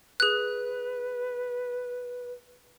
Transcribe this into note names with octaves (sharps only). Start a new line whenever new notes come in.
G#4 B4 F#6